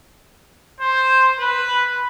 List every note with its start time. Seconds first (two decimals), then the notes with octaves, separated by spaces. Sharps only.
0.81 C5
1.39 B4